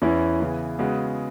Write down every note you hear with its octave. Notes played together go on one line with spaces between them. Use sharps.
E2 E3 C#4 E4
C#3 E3 B3 E4
C#3 G#3 B3 F#4